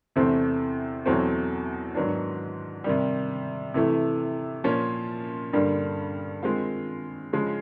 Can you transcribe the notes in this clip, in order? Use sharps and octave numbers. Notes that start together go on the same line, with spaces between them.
E2 C3 E3 A3 C4
E2 B2 F#3 A3 C4
G#2 D#3 F#3 B3 D4
C3 D#3 G3
C3 E3 A3
A#2 F3 A#3 C#4
G2 D3 G3 A#3
D#3 G#3 C4 F4
C#3 F3 G#3